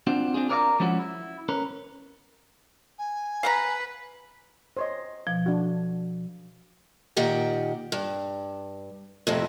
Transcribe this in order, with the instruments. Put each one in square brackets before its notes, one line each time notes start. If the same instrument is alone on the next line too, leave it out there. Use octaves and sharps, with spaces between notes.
[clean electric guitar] C4 D4 F4 F#4
C4 D4 F4 G#4
A#4 B4 D5 D#5 F5 A#5
F3 G#3 C#4 E4 F#4
E4
C#4 A#4 B4
[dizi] G#5
[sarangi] B4 [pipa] F5 F#5 A#5
[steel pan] C5 C#5 D#5
[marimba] B2 F3
[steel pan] D4 F#4
[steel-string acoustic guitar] A#2 D#3 G4 F#5
G2
F2 A2 C3